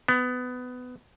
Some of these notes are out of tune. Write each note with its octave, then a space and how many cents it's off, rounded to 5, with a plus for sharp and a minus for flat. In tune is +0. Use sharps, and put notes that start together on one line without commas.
B3 +20